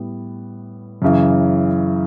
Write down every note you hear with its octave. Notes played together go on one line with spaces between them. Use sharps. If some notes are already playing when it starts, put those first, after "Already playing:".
Already playing: A2 G3 B3
F#2 C#3 E3